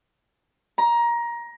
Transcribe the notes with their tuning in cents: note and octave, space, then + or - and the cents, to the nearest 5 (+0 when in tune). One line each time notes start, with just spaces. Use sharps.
A#5 +20